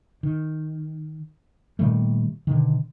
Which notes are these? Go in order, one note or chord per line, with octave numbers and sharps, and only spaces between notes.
D#3
A#2 D#3 G3 A3
B2 D3 D#3